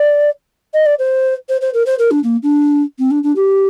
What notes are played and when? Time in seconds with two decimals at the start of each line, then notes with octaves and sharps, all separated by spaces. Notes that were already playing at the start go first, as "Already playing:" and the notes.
Already playing: D5
0.73 D#5
0.85 D5
0.98 C5
1.48 C5
1.61 C5
1.73 A#4
1.86 C5
1.98 A#4
2.10 D4
2.23 A#3
2.42 D4
2.98 C4
3.10 D4
3.23 D4
3.35 G4